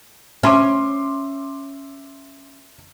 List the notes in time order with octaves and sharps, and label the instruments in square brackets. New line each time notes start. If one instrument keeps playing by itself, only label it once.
[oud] C#4 [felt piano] E5 C6 D6